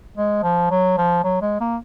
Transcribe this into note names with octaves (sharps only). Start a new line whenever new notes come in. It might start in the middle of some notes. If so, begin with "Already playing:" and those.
G#3
F3
F#3
F3
F#3
G#3
A#3